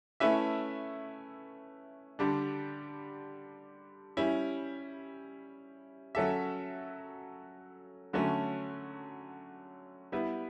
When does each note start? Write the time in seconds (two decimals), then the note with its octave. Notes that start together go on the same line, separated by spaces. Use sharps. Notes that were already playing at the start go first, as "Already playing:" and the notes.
0.20 A3 C#4 E4 B4 E5
2.19 D3 G3 D4
4.17 G3 C#4 E4
6.15 F#3 C#4 F#4 A4 E5
8.13 D3 F#3 A3 C#4
10.12 G3 B3 E4 B4